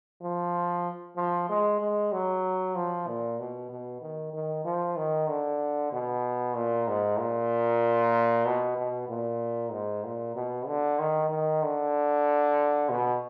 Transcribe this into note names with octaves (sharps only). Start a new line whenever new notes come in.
F3
F3
G#3
G#3
F#3
F3
A#2
B2
B2
D#3
D#3
F3
D#3
D3
B2
A#2
G#2
A#2
B2
B2
A#2
G#2
A#2
B2
D3
D#3
D#3
D3
B2